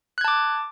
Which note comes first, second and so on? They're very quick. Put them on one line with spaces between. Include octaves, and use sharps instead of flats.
F#6 G#6 A5 D6